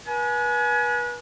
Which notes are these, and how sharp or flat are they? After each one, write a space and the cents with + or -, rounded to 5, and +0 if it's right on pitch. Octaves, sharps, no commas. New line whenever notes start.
B4 -35 G#5 +25